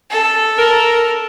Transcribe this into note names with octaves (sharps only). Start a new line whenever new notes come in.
A4
A#4